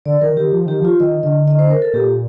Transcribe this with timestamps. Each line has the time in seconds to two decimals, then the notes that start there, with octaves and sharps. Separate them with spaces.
0.06 D3 D5
0.21 D#3 A#4
0.37 D#3 G4
0.53 F3
0.66 D#3 G4
0.80 F3 F4
1.00 D#3 D#5
1.23 D3 D#5
1.48 D#5
1.59 C5
1.71 A#4
1.82 A4
1.94 A#2 G4